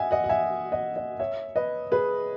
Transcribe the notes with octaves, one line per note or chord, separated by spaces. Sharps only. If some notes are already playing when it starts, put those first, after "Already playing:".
Already playing: D#5 E5 F#5 G#5
D#5 F#5
F#5
E5 G#5
D#5 F#5
D#5 F#5
C#5 E5
B4 D#5
G#4 B4